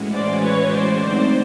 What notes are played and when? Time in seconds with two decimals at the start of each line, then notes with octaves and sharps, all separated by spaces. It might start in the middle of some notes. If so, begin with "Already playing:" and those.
Already playing: A2 E3 G#3 C#4 F#4
0.14 C5 D5
0.42 B4 C#5
0.70 C5 D5
0.99 D3 F#3 A3 C4 D#4 C5 D5